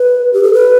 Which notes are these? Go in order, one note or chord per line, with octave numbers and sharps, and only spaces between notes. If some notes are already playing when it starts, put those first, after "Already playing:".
Already playing: B4
G4
A4
B4